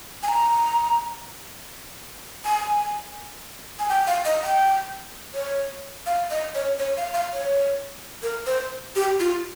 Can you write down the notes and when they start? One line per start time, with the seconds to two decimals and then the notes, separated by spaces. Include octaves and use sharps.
0.23 G#5
0.28 A#5
2.45 G#5
3.79 G#5
3.89 G5
4.07 F5
4.25 D#5
4.43 G5
5.34 C#5
6.06 F5
6.30 D#5
6.55 C#5
6.79 C#5
6.97 F5
7.14 F5
7.33 C#5
8.23 A#4
8.46 C5
8.96 G4
9.20 F4